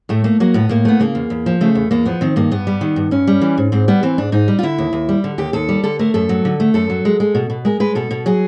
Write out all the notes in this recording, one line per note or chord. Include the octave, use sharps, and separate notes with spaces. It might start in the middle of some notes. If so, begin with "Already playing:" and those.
A2 A3
A3 A#3
F#3 A#3
A2 B3
A2 A#3
A3 B3
C#3 A#3
E2
E2
F3
C#3 A3
E2
E2 A#3
F3 B3
D#3 C4
G2 A#3
G2 B3
G3
D#3
G2
G2 C#4
G3
E3
G#2
G#2 C4
G3 B3
E3 C4
G#2 D4
G#2 D#4
G3
F4
D3 E4
D#2
D#2
G3
D3
D#2 G4
D#2 A4
G3
D3 A4
A3 A#4
F#2 A4
F#3
D3
A3
F#2 A4
F#3
G#3
G#3
B2
B2
G#3 A#4
G#3 B4
B2 A4
B2
F#3 G#4